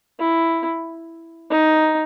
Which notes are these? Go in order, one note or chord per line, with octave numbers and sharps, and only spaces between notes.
E4
D#4